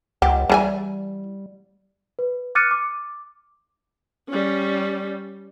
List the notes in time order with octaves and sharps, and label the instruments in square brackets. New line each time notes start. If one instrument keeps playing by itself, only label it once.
[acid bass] C#2 [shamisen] G4 [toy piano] F#5
[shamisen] E3 G#4 G#5 [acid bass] G3
[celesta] B4
D6 F6 F#6 A6 C#7 D#7
D6
[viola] G3 C#4